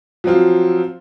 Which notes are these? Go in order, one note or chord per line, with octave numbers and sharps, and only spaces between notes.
F3 F#3 C4 F4